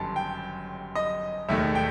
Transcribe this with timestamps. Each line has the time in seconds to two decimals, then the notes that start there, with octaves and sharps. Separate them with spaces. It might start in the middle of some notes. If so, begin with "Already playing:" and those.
Already playing: G1 F#2 D#3 G3 A5 C6
0.16 G5
0.95 D#5
1.49 E1 D#2 D#3 A3 E5
1.75 G5